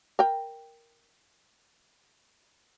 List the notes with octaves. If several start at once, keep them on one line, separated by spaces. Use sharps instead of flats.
A#4 G5